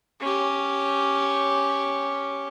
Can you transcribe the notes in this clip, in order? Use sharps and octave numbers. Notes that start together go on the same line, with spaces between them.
C#4 G4